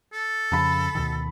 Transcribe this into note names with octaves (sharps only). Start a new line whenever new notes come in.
A4
F2 C#3 A5 B5
D2 B2 D#3